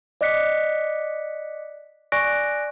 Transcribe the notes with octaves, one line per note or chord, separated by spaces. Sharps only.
D5 D#5 D6 F#6 B6 C#7
D5 G#5 C#6 F#6 A#6 D7